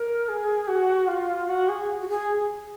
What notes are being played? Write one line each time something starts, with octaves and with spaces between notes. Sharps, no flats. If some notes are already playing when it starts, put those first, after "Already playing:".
Already playing: A#4
G#4
F#4
F4
F#4
G#4
F#4
G#4